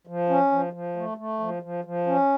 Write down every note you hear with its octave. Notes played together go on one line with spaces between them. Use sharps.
F3
C#4
F3
F3
A3
A3
F3
F3
F3
C#4